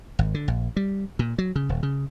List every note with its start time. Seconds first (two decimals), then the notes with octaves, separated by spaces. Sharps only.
0.19 G#1
0.34 D3
0.48 A#1
0.77 G3
1.19 A#2
1.38 F#3
1.56 C#3
1.69 D#1
1.83 C#3